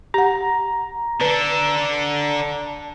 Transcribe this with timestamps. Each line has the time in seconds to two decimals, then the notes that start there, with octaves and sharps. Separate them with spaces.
0.14 G4 F#5 A#5
1.21 D3 D4 A4 B4